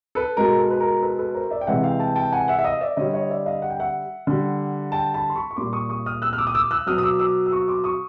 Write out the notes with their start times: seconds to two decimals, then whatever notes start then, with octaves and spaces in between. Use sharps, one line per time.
0.15 A4 B4
0.37 B2 G#3 A#4
0.59 A4
0.71 B4
0.80 A#4
1.02 A4 B4
1.19 A4 B4
1.34 A#4 C5
1.51 D5 E5
1.61 G5
1.67 C3 E3 G#3 E5 F#5
1.83 F5 G5
2.00 G5 A5
2.16 G5 A5
2.32 F#5 G#5
2.48 E5 F#5
2.59 E5
2.64 D#5 F5
2.81 D5 E5
2.97 D3 G3 C#5 D#5
3.13 C#5 D#5
3.30 D5 E5
3.46 D#5 F5
3.62 F#5
3.70 G5
3.79 E5 F#5
4.27 D3 G3
4.92 G5 A5
5.14 A5 B5
5.30 C6
5.36 B5 C#6
5.51 C#6
5.57 A#2 G3 C6 D6
5.73 C#6 D#6
5.89 C#6 D#6
6.06 D#6 F6
6.22 E6 F#6
6.33 F6
6.38 D6 E6
6.47 D#6
6.55 D6 E6
6.71 E6 F#6
6.86 B2 F#3 D#6 F6
6.98 D#6
7.03 D6 E6
7.19 D6 E6
7.46 E6
7.51 C#6 D#6
7.68 C6 D6
7.84 C#6 D#6